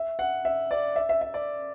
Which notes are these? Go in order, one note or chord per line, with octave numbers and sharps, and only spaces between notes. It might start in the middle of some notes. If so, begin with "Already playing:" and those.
Already playing: E5
F#5
E5
D5
E5
E5
E5
D5